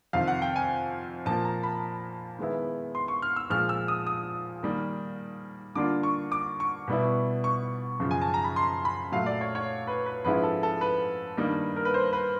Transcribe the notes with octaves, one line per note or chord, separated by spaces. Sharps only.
F2 C3 D#3 F5
F#5
G5
G#5
A#2 F3 A#3 A5
A#5
B5
D#3 G#3 B3 E4
C6
C#6
F6
E6
A#2 F3 G#3 F6
E6
D#6
D#6
D#3 G3 A#3
D3 G3 A#3 D4 F4 D6
C#6
D6
C#6
B2 G3 B3 E4
C#6
F#2 C#3 F3
G#5
A5
A#5
B5
C6
B5
A#2 F#3 A3 F5
D5
C#5
C#5
B4
B4
G#2 F3 G#3 C#4 E4 B4
A4
A4
B4
G2 D#3 G3 A#3 D#4
A#4
B4
C5
B4